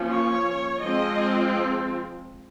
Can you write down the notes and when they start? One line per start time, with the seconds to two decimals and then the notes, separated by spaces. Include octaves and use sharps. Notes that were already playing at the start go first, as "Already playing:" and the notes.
Already playing: F3 A#3 C#4
0.11 C#5
0.81 F3 G#3 C4 D#5